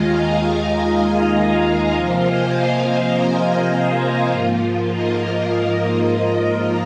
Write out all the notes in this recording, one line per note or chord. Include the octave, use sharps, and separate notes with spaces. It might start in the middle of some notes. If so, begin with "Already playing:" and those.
Already playing: D#2 D#3 G#3 F4 D#5 F5 G#5 A#5
F5 A#5
D#5 G#5
C3 F3 A#3 F4 C5 F5
D#5 G#5
D#5 G#5
D#5 G#5
F5 A#5
G#2 F3 A#3 F4
A#4 D#5